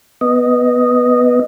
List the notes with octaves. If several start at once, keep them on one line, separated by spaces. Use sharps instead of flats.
B3 D#5